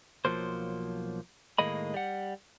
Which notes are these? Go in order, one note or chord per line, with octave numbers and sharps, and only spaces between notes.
B1 F3 F#3 A#3 C5
A2 D#3 G#3 A#3 D#5 B5
G3 F#5